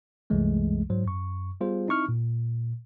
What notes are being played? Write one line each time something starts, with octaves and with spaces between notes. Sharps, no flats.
C2 F#2 E3 G#3 A3
G#2 F#3 C5
F#2 C#6
G3 B3 F4 G#4 C5
C4 D#4 E4 C#6 F6
A#2